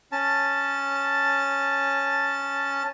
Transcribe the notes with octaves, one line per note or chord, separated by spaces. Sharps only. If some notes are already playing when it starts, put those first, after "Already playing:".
C#4 A5